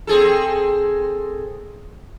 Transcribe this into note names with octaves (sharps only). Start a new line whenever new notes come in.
C4 G#4 A4